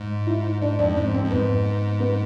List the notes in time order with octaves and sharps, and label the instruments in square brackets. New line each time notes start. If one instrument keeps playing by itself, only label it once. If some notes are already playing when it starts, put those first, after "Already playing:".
Already playing: [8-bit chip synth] G#2
[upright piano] E4
[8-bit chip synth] G#2 [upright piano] D4
[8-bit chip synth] F2 [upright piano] D4
[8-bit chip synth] G#2 [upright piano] C4
[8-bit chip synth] F2 [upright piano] C4
[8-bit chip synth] F2
[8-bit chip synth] G#2 [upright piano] B3
[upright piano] B3